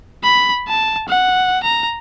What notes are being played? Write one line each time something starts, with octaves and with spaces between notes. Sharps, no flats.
B5
A5
F#5
A#5